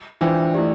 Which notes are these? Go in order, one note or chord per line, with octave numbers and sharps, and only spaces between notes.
E3 D4 F4 C5 G5
A3 E4 G4 D5